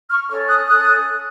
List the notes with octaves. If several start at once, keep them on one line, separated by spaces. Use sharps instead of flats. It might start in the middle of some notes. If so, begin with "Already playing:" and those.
C#6 F6
C#4 A4 C#5 C#6 F6
D#6 F#6
C#4 A4 C#5 D#6 F#6